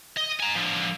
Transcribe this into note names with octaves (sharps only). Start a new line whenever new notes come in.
D#5
G#5 A#5
D3 F3